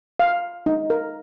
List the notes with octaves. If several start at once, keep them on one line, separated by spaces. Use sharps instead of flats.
F5
D#4
A#4